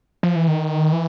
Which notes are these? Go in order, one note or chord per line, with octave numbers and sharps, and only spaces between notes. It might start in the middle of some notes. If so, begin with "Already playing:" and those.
F3
E3
D#3
E3